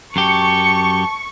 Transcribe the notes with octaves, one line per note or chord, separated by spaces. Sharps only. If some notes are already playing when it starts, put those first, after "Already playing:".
F#2 G4 A5 C#6